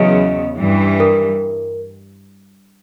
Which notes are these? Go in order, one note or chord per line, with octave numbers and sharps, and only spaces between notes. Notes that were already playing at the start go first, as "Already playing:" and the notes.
Already playing: E2 C#3 F#3 B3 D#5
G2 E3 G3
A#4